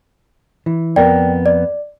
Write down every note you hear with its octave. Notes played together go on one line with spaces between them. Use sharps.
E3
F2 B3 A#4 D5 G5
D5